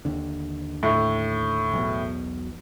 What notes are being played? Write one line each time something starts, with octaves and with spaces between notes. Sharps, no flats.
D#2 D3
A2
B1 E2 B2